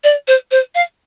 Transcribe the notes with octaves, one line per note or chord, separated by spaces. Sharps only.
D5
C5
C5
F5